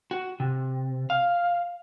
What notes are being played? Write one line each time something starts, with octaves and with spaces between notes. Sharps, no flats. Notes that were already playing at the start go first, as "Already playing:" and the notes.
F#4
C3
F5